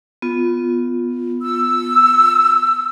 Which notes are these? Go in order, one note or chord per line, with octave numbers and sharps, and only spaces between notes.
B3 F4
E6